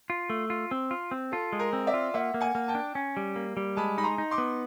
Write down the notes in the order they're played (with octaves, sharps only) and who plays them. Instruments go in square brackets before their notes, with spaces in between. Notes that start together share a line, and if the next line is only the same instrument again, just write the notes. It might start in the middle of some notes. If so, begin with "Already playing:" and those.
[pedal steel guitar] F4
A3
F4
C4
F4
C4
[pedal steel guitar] F4 [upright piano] A4
[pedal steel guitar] G#3
[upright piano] A#4
[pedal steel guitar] C4
[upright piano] D5 E5
[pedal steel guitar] F4
[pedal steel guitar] A#3 [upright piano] E5 F#5
[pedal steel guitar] A#3
[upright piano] F#5 G#5
[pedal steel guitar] A#3
[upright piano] G5 A5
[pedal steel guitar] D4
C#4
G3
A#3
G3
[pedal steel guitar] G#3 [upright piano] A5 B5
[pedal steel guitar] D#4 [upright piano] B5
[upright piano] A#5 C6
[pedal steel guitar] D#4
[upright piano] C6 D6
[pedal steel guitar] B3